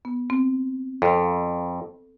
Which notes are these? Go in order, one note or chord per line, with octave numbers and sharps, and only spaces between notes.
B3
C4
F2 A4